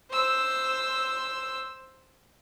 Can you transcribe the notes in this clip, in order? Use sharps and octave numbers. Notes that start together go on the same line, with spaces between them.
C5 E6